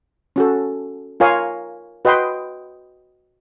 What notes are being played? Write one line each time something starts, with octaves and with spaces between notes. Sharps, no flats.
C#4 F#4 A4
F4 A#4 C#5 F5 G#5
F#4 B4 D#5 G5 C6